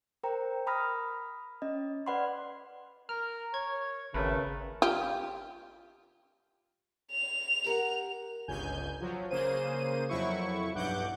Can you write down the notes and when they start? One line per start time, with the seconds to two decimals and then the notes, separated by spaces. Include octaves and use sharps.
0.23 A#4 C5 G5 A#5
0.67 A#5 B5 D#6 F6 A#6
1.62 C#4 D#5
2.06 B4 D5 F#5 B5 C6
3.09 A#4 F6
3.54 C#5 G#6
4.14 G#1 C#3 A3 A#4 B4
4.82 F4 G4
7.12 F7
7.64 G4 A#4 F#5
8.48 G1 C#2 G#5 G6
9.00 F3 F#3
9.30 C#3 A#3 G#4 C5 D#7
10.09 F2 F#3 E4 C#6
10.75 B1 G2 F#5 D6 G6